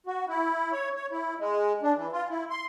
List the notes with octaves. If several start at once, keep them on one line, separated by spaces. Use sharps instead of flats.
F#4
E4
C#5
C#5
E4
G#3
D4
E3
F4
E4
C6